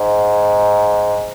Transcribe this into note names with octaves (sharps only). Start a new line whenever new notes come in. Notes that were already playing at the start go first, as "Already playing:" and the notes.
Already playing: G#2